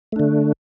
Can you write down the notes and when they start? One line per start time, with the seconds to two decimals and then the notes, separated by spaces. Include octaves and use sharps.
0.12 A3
0.16 D4
0.20 D3